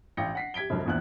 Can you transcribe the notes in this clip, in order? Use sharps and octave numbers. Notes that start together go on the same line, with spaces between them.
A1 F5 G5 A#6 C#7
F#5 B6 C7
G4 G#6 B6 D7 G7
F1 C2 F#3
A#1 E2 F#6